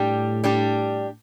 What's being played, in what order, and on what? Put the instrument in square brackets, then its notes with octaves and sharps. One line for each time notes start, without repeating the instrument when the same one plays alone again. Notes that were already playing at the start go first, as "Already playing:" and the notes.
Already playing: [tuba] A2 [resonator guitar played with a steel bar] G3 D4 G4
[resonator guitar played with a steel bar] G3 D4 G4